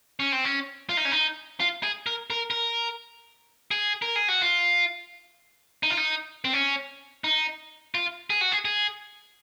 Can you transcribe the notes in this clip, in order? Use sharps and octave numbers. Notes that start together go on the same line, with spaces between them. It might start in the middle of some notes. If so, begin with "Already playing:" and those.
C#4
C4
C#4
F4
D#4
C#4
D#4
F4
G#4
A#4
A#4
A#4
G#4
A#4
G#4
F#4
F4
D#4
F4
D#4
C4
C#4
D#4
F4
G#4
F#4
G#4
G#4